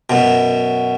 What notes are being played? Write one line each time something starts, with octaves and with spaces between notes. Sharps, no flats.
F#2 B2